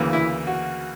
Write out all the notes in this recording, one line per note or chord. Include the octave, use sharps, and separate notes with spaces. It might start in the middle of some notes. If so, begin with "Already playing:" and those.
Already playing: D2 C#3 E3 A#3
E4
F#4